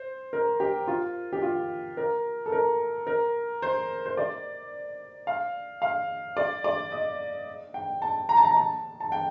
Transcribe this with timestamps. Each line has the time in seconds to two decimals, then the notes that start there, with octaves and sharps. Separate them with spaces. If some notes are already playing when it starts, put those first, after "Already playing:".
Already playing: C5
0.33 A#4
0.60 G4
0.88 F4
1.33 G4
1.42 F4
1.97 A#4
2.46 A4
2.52 A#4
3.07 A#4
3.62 C5
4.06 C5
4.17 D5
5.27 F5
5.82 F5
6.37 D5
6.64 D5
6.92 D#5
7.74 G5
8.02 A5
8.29 A#5
8.37 A5
8.45 A#5
8.57 A5
9.00 A5
9.12 G5